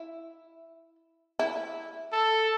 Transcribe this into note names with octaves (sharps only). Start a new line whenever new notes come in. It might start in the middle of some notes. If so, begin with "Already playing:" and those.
Already playing: E4
E4
A4